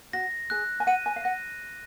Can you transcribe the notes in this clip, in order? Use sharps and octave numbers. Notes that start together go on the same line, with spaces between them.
F#4 A#6
G#4 F#6
G#5
F#5 D#7
G#5
F5
F#5 A#6